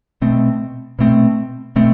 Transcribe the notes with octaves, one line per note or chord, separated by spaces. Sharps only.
B2 A3 C4
B2 A3 C4
B2 A3 C4